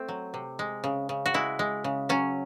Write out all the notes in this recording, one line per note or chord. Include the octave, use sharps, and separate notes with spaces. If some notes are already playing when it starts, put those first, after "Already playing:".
Already playing: A3 C4
F#3
C3
G#3
C#3
C#3
F#4
G#3 E4
G#3
C#3
F#3 C#4